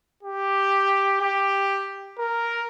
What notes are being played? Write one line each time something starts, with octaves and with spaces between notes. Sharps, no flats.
G4
G4
A#4